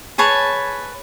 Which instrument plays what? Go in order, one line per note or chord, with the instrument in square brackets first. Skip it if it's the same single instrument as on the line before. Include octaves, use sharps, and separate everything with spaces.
[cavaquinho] G#4 B4 C#5 A5